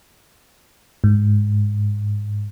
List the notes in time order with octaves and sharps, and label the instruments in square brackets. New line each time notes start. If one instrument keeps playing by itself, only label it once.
[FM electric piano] G#2